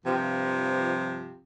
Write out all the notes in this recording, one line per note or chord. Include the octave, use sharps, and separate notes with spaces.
G2 C3 F3